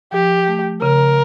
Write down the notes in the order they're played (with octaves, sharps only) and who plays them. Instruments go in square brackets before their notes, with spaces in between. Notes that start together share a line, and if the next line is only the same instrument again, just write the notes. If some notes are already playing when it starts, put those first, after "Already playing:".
[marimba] F3 [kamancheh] G4
[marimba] A3
[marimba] C#3 [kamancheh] A#4